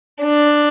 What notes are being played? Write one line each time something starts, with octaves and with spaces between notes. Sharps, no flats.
D4